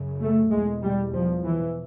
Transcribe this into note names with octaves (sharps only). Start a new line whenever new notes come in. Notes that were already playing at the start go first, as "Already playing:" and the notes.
Already playing: F#2 C#3
A3
E2 B2 G#3
G3
F3
E3